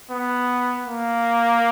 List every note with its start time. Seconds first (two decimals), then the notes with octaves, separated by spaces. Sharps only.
0.11 B3
0.85 A#3